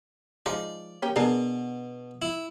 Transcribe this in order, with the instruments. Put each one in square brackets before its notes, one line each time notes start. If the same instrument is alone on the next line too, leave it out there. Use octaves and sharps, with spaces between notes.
[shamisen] F3 G#3 D#4 [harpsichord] D5
[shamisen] A#3 C#4 G4
[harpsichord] B2 [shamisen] D4 G#4 A#4
[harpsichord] E4